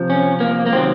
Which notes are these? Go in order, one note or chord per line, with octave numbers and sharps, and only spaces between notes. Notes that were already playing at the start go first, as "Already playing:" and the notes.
Already playing: C3 F3
C#4
A#3
A#3
C3 D#3 F#3 C4